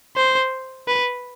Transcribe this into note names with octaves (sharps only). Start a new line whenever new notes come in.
C5
B4